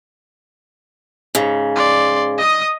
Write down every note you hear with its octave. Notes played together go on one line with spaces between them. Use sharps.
G#2 C#3
D5 C6
D#5 D#6